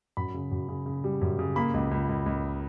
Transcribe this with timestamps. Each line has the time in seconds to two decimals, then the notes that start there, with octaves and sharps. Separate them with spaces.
0.17 F#2 B5
0.34 C#3
0.51 F#2
0.68 C#3
0.86 C#3
1.04 G3
1.21 F#2
1.39 C#3
1.56 A#3 B5
1.74 C#2
1.91 C#2
2.09 C#2
2.26 C#2